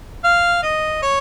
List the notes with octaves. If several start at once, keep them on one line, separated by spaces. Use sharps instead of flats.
F5
D#5
C#5